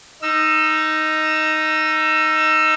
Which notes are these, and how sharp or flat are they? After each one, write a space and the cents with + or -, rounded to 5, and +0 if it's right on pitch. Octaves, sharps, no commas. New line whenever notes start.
D#4 +0 E6 +25